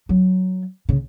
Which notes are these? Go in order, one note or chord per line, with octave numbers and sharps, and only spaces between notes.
F#3
C#3